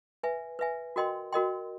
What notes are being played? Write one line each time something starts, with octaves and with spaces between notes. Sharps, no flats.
B4 E5 G#5
B4 E5 G#5
F#4 A#4 D#5 G5 C6
F#4 A#4 D#5 G5 C6